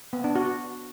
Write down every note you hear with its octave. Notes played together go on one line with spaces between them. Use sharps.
B3
D4
F#4